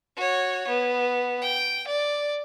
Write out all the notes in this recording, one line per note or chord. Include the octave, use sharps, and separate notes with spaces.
F#4 C#5
B3
G5
D5